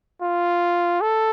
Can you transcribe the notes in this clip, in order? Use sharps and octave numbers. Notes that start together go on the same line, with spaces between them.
F4
A4